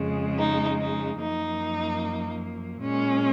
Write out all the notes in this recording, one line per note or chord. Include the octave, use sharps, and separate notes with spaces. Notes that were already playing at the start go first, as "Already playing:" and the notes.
Already playing: F2 C#3 G#3
D#4
D#4
F#2 F3 A#3 D#4
A#2 G#3 C#4